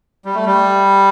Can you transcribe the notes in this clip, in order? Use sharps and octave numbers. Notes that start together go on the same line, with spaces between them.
G3
A3
G3